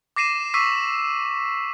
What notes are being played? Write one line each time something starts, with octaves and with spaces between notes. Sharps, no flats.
D6 A#6 C7 D#7 E7
C#6 D6 E6 B6 C7 D#7